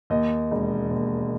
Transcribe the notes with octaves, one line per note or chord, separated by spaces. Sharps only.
D#2 D#5
E1
D#2